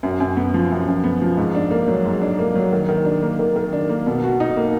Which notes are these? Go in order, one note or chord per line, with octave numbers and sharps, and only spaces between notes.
F#2
F#2
B3
F3
F#2
F#2
B3
F3
G#2
D4
A#3
F#3
G#2
D4
A#3
F#3
D#3
D#3
D4
A#3
D#3
D#3
D4
A#3
B2
F#4
D#4
A#3